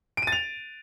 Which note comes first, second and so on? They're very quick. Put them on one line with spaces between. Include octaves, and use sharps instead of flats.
D7 D#7 A6 F7